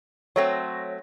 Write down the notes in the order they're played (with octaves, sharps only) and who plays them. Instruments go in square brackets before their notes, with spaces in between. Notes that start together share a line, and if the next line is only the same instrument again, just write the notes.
[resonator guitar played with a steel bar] F#3 A3 C4 [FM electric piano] C#5 A#6